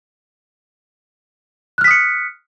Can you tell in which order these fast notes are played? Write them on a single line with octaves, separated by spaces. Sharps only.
F#6 F6 B6 D#6 C#7